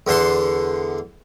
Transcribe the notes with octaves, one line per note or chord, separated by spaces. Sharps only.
E2 D3 F#5 A5 C6